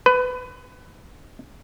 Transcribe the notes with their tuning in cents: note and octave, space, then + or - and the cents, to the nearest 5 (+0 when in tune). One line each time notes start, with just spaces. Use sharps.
B4 +25